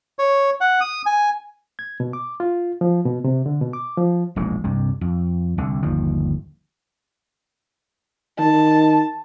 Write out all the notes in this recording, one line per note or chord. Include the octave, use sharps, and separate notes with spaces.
C#5
F#5
D#6
G#5
G#6
B2
D6
F4
F3
B2
C3
D3
B2
D6
F3
E1 A#1 G#2 G#3
C2 G2 C3
F2
C2 D3
G1 D#2 F3
D#3 A5